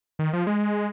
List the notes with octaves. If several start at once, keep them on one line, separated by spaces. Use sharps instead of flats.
D#3
F3
G#3